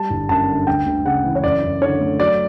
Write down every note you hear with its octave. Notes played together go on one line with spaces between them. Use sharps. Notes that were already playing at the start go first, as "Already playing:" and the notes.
Already playing: G3 A5
G1
F#2 A5
D3
D2 G5
D2
C#3 F#5
E3
C#5
F#2 D5
F#2
D3 C#5
A3
F#3 D5